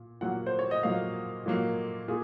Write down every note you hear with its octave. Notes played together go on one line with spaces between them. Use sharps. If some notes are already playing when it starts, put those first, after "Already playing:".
Already playing: A#2
A#2 F#3 A#3 F#5
C5
C#5
D#5
A#2 F#3 A#3 F5
A#2 F#3 A#3
A#2 G#4